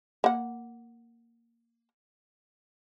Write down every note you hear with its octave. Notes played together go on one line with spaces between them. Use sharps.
A#3 F#5